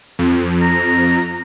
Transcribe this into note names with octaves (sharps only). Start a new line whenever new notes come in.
F2
A#5